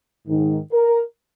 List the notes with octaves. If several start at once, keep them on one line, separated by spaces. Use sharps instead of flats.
G#2 D#3
A#4